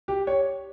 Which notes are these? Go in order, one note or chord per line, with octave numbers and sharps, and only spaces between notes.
G4
C#5